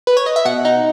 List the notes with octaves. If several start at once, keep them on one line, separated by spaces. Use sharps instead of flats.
B4
C#5
D#5
E5
B2 F#5
D#4